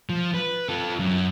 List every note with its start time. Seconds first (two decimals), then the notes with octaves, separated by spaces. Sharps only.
0.10 F3
0.34 B4
0.69 F4 A4
0.99 F#2